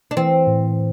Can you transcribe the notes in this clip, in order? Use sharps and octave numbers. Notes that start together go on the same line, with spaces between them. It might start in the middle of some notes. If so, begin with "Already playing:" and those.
D4
E3 C4
A2